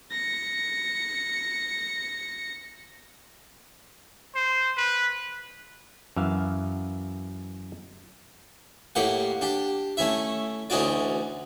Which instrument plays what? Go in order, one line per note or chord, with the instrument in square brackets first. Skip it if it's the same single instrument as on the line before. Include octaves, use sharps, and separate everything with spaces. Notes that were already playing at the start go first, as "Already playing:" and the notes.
[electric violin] A#6 C#7
[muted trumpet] C5
B4
[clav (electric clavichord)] F#2 E3 E5 F5
[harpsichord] A2 A#3 G4 F#5
D4 G4
A3 C#4 E4 E5
D2 E3 C#4 D#4 F#4 D5